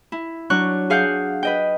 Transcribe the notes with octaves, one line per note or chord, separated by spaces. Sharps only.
E4
F#3 D4 C#6 F#6
G#4 F5 F#5 F6 G6
B4 D#5 G5